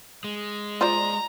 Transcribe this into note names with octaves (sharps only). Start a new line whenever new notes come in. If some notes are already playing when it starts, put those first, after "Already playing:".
G#3
F4 C5 D5 A#5